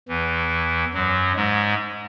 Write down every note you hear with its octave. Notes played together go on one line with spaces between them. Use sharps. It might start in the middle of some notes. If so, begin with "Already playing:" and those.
E2 E3
F#2 F#3
G#2 G#3